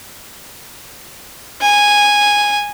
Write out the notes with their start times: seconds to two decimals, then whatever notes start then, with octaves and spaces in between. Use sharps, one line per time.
1.61 G#5